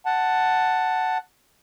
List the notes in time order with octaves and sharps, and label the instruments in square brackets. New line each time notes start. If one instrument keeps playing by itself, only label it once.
[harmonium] F#5 A5